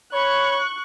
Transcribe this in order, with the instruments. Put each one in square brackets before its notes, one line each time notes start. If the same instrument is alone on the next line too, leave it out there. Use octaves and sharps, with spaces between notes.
[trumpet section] C#5 [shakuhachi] B5 [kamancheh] C#6 F#6